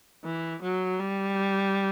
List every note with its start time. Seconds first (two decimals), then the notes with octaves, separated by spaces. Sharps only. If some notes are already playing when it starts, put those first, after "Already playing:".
0.24 E3
0.62 F#3
0.99 G3